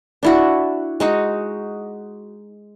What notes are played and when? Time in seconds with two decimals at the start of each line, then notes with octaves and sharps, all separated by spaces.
0.23 D4 E4 F#4
1.00 G#3 D#4 F#4